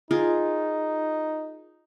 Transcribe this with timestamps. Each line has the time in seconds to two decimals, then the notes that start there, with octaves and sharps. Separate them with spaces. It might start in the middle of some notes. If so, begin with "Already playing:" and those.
0.11 D#4 F4 G#4 A#4